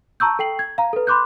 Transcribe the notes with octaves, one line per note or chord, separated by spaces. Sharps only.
A5 A#5 C#6 E6 G6
A4 G5 C7 F#7
G#6
F5 A#5
A4 B4
B5 C6 D6 F#6 G6